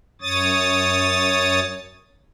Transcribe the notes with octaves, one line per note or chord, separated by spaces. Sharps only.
F#2 C#5 D#6 A6